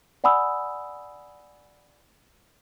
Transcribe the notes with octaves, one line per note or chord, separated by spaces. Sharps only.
D5 F#5 G#5 B5 D#6 E6